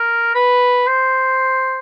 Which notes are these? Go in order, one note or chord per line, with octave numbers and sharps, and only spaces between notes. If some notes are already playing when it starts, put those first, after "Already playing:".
Already playing: A#4
B4
C5